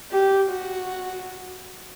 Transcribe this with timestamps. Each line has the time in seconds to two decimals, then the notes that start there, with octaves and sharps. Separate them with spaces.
0.12 G4
0.50 F#4